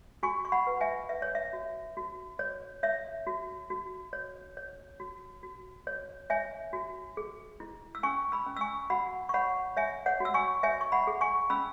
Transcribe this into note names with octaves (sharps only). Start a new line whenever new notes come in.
F#4 G#5 C#6
C#6
F#5 B5
B4
E5 G#5
B4 E5
C#5
E5
F#4
F#4
C#5
C#5 E5
F#4
F#4
C#5
C#5
F#4
F#4
C#5
C#5 E5 G#5
F#4
G#4
E4
E6
C#4 G#5 C#6
B5 E6
C#4
E6
G#5 C#6
F#4 F#5 B5
C#6
C#5 F#5 B5
C#5 E5 G#5
C#5 F#5
F#4 E6
G#5 C#6
C#5 E5 G#5
C#6
F#5 B5
G#4
G#5 C#6
C#4 B5 E6